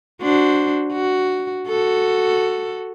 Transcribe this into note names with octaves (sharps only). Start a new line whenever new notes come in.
D4 F#4 C5
F#4
F#4 A4